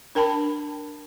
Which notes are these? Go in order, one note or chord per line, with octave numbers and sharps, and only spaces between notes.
D4 A#4 G5 A5 B5